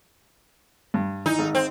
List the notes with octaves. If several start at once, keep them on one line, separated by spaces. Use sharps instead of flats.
G2
E3 D#4
G#1
C4